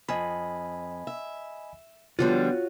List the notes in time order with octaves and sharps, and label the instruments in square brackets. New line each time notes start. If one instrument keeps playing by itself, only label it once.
[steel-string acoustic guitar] F2 [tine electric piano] D#5 G#5 B5
[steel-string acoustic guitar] E5
[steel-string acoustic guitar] D3 F3 G3 [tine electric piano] B3 D4 [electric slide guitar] F4 F#4 C#5